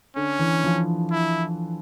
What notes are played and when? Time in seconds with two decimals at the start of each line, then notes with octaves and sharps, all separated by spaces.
0.16 D3 C#4
0.39 E3
0.64 F3
1.11 E4